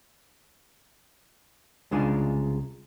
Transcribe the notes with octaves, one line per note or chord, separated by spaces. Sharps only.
C2 C#3 G#3 D4 F4 G#4